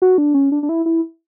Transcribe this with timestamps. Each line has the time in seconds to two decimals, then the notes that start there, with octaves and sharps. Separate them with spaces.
0.02 F#4
0.18 D4
0.34 C#4
0.52 D4
0.63 D4
0.69 E4
0.86 E4